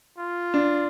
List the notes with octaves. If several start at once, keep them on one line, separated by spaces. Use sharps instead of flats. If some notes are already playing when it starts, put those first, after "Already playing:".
F4
D4